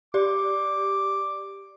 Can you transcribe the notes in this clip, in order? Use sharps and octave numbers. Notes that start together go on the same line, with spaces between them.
G4 D5 D6